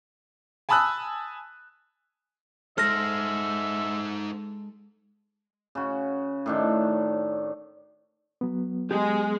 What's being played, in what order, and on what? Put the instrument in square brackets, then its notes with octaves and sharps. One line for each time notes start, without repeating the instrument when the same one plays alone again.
[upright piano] G#5 A5 B5 D#6 E6 F#6
[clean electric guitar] G#3 A4 [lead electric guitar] D#4 C5 [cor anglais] E5 [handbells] F6 A#6
[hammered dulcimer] C#3 F#4
A2 D#3 D4
[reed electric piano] F#3 B3
[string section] G#3 [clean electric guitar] G4 G#4